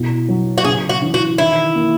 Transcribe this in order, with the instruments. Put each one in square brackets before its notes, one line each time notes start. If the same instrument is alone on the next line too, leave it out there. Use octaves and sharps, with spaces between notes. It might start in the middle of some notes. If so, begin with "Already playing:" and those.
Already playing: [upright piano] B2 E4
F#3
[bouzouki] F#4
[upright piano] C#3 [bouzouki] G#4
[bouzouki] F#4
[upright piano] E3
[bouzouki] F#4
[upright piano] D#3 [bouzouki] E4
[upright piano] A#3